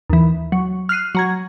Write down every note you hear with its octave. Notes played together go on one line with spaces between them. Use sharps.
D#2 E3
F#3
F6 F#6 C7 D#7
F#3 A#5 G#6